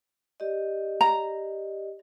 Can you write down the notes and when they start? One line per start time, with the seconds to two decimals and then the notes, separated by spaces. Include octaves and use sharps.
0.40 G4 D5 D#5
1.01 A#5